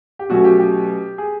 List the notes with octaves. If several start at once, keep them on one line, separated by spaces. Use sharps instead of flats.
G4
B2 F#3 A3 C#4 F#4
G4
G4
G#4